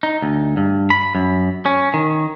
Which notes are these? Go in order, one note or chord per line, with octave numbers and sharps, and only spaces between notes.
D#4
D2
G2
B5
F#2
C#4
D#3